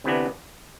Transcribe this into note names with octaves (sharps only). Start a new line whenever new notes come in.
D2 C3 E3 B3 D4